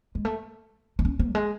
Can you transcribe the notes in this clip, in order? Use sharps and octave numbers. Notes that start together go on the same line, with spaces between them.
G#3
A3
D#4
C#4
C4
F#3
G#3